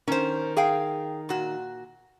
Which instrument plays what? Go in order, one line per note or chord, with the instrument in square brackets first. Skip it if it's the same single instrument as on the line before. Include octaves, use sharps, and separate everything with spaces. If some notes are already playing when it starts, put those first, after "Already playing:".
[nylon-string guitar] D#3 [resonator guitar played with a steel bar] C#4 C5
[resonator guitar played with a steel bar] G#4 F5 G5
A#2 F#4